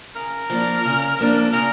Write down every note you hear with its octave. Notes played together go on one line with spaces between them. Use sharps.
C#3 A#4
F3 A#3 D4
C#3
F3 A#3 D4
C#3 A#4